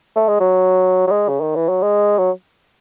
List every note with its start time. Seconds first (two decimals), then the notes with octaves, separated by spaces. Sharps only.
0.16 A3
0.29 G#3
0.40 F#3
1.07 F#3
1.11 G#3
1.28 C#3
1.41 D#3
1.56 E3
1.69 F#3
1.82 G#3
2.18 F#3